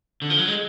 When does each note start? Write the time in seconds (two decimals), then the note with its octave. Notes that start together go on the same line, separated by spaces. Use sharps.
0.22 D3
0.30 F3
0.39 F#3
0.48 G#3